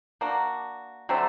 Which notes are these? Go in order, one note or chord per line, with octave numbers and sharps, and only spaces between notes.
A#3 D4 F#4
D3 F#3 A3 C4